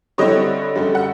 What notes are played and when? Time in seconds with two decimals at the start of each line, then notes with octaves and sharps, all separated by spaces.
0.18 D3 G3 C4 E4 C#5 D#5
0.75 F#2 D3 G3
0.95 F#5